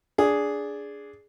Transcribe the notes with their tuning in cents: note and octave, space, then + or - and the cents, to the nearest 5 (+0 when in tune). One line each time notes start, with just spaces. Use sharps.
D4 -10 G#4 +0